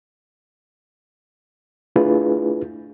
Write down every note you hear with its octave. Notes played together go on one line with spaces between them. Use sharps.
A3 D4 E4 F4 G#4 B4